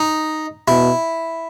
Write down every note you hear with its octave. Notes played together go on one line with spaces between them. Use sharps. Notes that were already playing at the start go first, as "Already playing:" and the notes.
Already playing: D#4
B2 E4